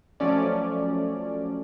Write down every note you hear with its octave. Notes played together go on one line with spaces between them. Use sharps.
F3 F#3 A3 C#4 D5